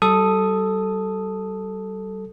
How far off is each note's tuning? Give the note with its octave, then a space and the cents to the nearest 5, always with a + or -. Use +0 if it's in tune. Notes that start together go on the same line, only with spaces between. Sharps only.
G3 -35 A4 +0 D#6 +0